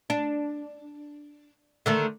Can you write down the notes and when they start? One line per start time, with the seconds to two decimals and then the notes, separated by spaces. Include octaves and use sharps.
0.10 D4
1.86 D3 D#3 A3